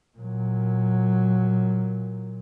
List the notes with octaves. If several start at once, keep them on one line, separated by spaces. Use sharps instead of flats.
A#2 F#3